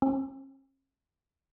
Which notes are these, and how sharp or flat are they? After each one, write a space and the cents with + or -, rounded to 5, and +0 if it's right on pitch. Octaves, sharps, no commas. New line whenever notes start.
C#4 -45